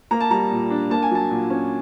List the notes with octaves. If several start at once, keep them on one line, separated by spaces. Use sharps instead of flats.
A#3 A#5
A5
G3 A#5
A#2
D4
A#3 A5
G#5
F#3 A5
A#2
C#4